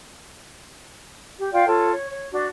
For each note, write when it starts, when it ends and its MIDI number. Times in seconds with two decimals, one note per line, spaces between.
1.38 1.47 67
1.52 1.66 65
1.52 1.66 74
1.52 1.66 77
1.52 1.66 79
1.66 1.91 65
1.66 1.91 69
1.66 1.91 73
1.92 2.09 73
2.09 2.26 73
2.31 2.45 62
2.31 2.45 66